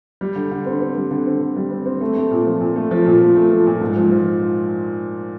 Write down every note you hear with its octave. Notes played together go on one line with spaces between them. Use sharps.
G3
D3
D3
C4
C4
G3
D3
C4
D3
G3
C4
C4
A3
A3
A#2
F3
A#2
A3
F3
A#2
A3
A3
F3
A#2
G#2
F3
F3